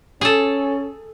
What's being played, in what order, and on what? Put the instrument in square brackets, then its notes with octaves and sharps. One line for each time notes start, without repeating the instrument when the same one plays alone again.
[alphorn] C#4 [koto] G#4 A4